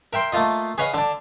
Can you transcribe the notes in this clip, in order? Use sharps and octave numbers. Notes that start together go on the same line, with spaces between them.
A#4 E5 G5 C6
A3 A#3 F4 D#5
G#4 B4 C#5 D#5 F5
D3 D4